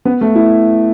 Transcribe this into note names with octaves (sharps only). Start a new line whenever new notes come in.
B3
A3
E4